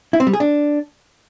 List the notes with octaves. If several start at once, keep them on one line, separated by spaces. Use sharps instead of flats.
E4
C4
G3
G#4
D4